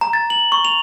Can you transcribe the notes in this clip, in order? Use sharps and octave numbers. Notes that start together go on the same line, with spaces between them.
A#5
A6
F#7
C#6
F7